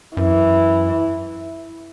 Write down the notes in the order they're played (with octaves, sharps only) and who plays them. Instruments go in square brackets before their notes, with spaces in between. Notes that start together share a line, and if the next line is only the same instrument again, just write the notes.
[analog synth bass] F#2 [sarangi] E3